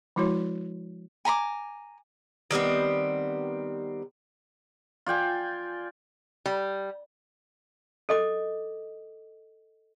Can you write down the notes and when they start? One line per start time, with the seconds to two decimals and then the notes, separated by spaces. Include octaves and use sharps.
0.16 F3 G#3 E4 F#4 C#5
1.25 G#5 A#5 B5 D6
2.51 D#3 G3 B3 C4
5.06 F4 D5 G5 G#5
6.46 G3
8.09 A4 D#5 D6